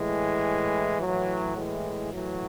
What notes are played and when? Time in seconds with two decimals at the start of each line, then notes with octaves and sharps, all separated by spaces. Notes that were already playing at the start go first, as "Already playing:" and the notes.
Already playing: A2 E3 G#3
1.01 A2 E3 F#3
1.57 E3 G#3
2.13 A2 E3 F#3